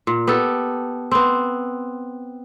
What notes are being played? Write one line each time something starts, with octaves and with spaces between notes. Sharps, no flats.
A#2
B3 G4 A4
B3 C4